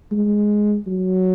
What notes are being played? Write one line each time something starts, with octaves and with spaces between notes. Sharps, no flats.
G#3
F#3